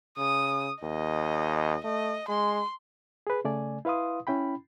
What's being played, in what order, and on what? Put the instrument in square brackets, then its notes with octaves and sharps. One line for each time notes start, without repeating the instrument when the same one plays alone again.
[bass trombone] C#3 [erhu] D#6
[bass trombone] D#2 [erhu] D#5
[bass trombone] A3 [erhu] D#5
[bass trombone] G#3 [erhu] C6
[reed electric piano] G#4 B4
C#3 A3 D5 G#5
E4 B4 F5 C6 D#6
C#4 E4 G5 B5